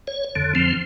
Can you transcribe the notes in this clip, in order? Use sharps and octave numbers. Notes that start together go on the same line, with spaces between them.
C#5
F2 D3
F2 F3 C4